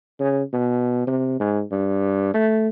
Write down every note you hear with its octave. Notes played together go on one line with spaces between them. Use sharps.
C#3
B2
C3
G#2
G2
A3